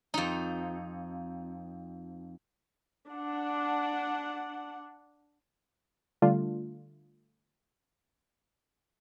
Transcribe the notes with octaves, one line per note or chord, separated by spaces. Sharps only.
F2 D#4
D4 F#5
D3 G3 A3 D4 F4